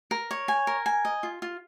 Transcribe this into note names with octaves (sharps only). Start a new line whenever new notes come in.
A#4
C#5
G#5
A#4
G#5
D#5
F4
F4